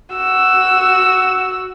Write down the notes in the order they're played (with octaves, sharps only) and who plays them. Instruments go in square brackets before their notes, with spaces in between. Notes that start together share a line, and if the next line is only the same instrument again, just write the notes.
[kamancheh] F#4 E6